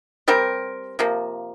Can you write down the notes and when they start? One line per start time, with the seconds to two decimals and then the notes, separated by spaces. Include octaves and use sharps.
0.28 G3 C4 G4 A#4
0.99 C3 F3 A#3